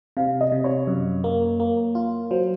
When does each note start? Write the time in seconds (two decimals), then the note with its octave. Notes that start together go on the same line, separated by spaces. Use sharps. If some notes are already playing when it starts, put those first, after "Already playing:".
0.17 C3 F5
0.41 D#5
0.52 C3
0.64 C#5
0.87 F#2
1.24 A#3
1.60 A#3
1.95 F4
2.31 F#3 C5